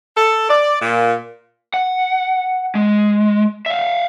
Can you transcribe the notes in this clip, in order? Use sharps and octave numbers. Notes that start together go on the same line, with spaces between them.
A4
D5
A#2
F#5
G#3
E5 F5